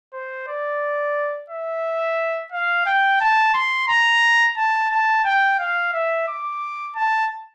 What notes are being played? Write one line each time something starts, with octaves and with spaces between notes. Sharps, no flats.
C5
D5
E5
F5
G5
A5
C6
A#5
A5
A5
G5
F5
E5
D6
A5